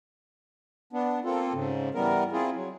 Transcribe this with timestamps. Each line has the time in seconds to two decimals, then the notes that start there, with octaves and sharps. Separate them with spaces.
0.93 B3 D4
1.25 A#3 C4 F4 A4
1.53 G#2 C#3
1.95 E3 G3 B3 A#4
2.32 C4 E4 F4 G#4
2.55 F#3